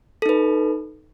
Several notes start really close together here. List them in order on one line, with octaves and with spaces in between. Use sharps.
A4 D#4 B4